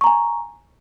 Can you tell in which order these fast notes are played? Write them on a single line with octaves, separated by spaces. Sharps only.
C#6 A#5 G#5